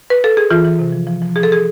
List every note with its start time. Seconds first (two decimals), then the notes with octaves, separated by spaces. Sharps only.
0.10 B4
0.24 A4
0.37 G#4
0.50 E3 F4
0.64 E3
0.79 C3
0.92 F3
1.07 F3
1.22 F3
1.36 F3 G#4
1.43 A4
1.52 G#4